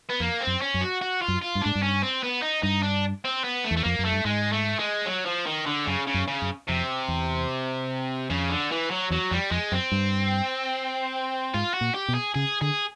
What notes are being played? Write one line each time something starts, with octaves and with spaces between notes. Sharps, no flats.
B3
F2 A#3
C4
F#2
C#4
F#2
F#4
F#4
F4
F#2
F4
G2
G#2 D4
G2
C#4
C4
B3
D#4
G2 D#4
D4
C4
B3
A3
E2
A3
F2 A#3
F#2
A3
G2
G#2 G#3
A3
G#3
F#3
F3
D#3
D3
F#2 C#3
C#3
F#2
C#3
F#2
F2 C3
E2
F2 C#3
D3
E3
F#3
E2 F#3
F2 G3
F2 G#3
F#2 C4
G2
G#2 F4
F#4
A#2
G4
B2
G#4
C#3 G#4
D3 G#4